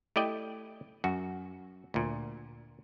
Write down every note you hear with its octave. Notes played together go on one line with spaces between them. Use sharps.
A3 E4 G4 D5 D#5 G5
F#2 F#4
D2 A#2